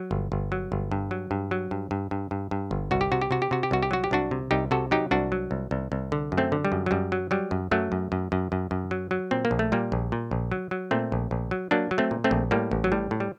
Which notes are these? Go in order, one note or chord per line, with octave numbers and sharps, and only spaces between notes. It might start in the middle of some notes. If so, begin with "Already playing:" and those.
Already playing: F#3
G1
G1
F#3
G1
G2
F#3
G2
F#3
G2
G2
G2
G2
G2
G1
C2 F#4
G4
C3 F#4
G4
C3 F#4
G4
C3 F#4
G4
C2 F#4
G4
F#3 F#4
G4
C2 D4 F#4
C3
C2 D#4 G4
C3 F#4 A4
F#3 D#4 G4
C2 D4 F#4
F#3
C2
C2
C2
D3
F#2
A3 C4
D3
G3
F#2
F#3
F#2 G3
F#3
F#3 G3
F#2
F#2 F#3 A3
F#2
F#2
F#2
F#2
F#2
F#3
F#3
A#2 C4
A#3
A#1
A3
A#2 G3 A#3
A#1
A#2
A#1
F#3
F#3
A#2 A3 C4
A#1
A#1
F#3
F#3 A#3 D4
F#3
A3 C4
A#2
A3 C4
A#1
A2 G3 A#3
A1
F#3
A2 G3
A2
G3